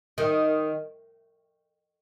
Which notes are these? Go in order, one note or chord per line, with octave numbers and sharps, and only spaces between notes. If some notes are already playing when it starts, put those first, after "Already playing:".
D#3